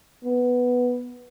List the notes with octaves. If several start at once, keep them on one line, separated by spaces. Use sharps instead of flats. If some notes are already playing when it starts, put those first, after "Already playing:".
B3